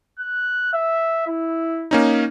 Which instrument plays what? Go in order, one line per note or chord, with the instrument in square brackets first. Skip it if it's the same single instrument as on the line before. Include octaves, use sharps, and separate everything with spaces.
[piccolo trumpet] F#6
E5
E4
[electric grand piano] A#3 C#4 D#4